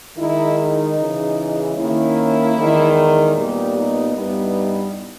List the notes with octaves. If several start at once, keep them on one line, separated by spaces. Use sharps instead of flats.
D#3 G#3 D#4 E4
D#4
C#3 E3 G#3
D#3 A#3 C#4 E4
E2 D#3 G#3
A#2 G3 B3 D#4 G4
D#4
G2 G3 B3 D#4 E4